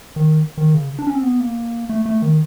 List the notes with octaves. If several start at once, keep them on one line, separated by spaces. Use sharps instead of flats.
D#3
D#3
C#3
D4
C#4
C4
B3
A#3
A3
A3
D#3